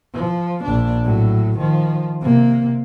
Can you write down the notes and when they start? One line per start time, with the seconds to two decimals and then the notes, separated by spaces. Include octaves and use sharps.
0.14 F3
0.64 A#1 D4
1.04 A2 F#3
1.58 D#3 F3
2.21 C3 A#3